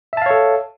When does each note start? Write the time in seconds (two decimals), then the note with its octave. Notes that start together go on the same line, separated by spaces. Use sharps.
0.13 E5
0.17 A5
0.22 F5
0.26 C#5
0.30 A4